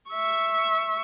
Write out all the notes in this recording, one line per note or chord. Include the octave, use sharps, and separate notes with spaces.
E5 C#6